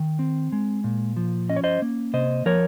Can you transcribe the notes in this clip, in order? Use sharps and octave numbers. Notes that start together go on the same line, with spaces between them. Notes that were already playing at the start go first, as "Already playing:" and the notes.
Already playing: D#3
C4
G#3
A#2
F3
C#4 D#5
C#5
C5 D#5
A#3
C3 C5 D#5
F3 A#4 C#5